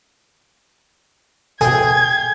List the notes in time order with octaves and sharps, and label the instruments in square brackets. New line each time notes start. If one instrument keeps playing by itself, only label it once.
[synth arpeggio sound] B2 A4 [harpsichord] G#4 [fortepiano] G5 G#5 [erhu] G#6